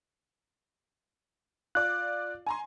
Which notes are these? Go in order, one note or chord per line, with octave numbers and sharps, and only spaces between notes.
F4 D5 F#6
G#5 A#5 C6